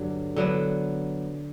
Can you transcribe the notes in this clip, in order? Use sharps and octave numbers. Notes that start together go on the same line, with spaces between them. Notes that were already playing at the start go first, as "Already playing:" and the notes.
Already playing: G2 D3 F#3
D3 F#3 B3